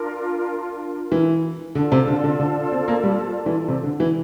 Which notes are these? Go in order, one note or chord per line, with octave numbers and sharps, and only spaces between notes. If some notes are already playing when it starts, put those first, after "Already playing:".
Already playing: D4 F4 A#4
E3
D3 F4 A4 D5 A5
C3
D3
D3
D3
C4
A#3
G3
E3
C3
D3
E3